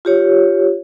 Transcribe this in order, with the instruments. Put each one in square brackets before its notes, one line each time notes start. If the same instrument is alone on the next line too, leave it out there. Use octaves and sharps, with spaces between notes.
[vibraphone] F4 G4 C#5